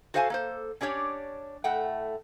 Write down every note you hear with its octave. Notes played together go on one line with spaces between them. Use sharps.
F#4 A4 C5 F5 G5 G#5
A#3 A4 C5
C#4 D4 G4 C#5 D5
A2 A3 F#5 G5